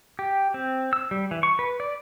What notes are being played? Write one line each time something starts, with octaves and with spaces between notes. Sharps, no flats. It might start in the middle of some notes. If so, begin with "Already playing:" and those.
G4
C4
E6
G3
E3
C#6
B4
D5